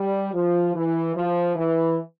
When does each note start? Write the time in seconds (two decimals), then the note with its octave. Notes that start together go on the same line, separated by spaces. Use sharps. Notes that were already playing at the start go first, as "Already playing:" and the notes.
Already playing: G3
0.34 F3
0.75 E3
1.15 F3
1.56 E3